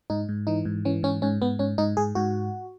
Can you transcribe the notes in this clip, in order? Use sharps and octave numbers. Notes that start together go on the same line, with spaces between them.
G#2 D#4
G#2
E3 D#4
G#2
E3 C#4
G#2 C#4
G#2 C#4
G#2 B3
G#2 C#4
G#2 D#4
G#2 G#4
G#2 F#4